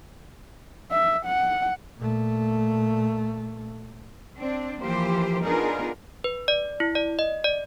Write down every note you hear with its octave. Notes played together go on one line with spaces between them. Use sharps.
E5
F#5
A#2 A3
C4 D4
E3 F3 A#3 G4 C5
B3 D4 D#4 F4 G#4 A#4
B4
D5
E4
D5
D#5
D5